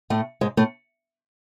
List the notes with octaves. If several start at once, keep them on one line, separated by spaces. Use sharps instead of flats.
A2 A3
G#2 G#3
A2 A3